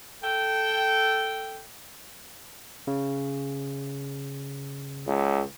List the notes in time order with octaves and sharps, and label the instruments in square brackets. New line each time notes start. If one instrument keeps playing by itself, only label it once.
[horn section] A4 G5
[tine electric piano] C#3
[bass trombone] C#2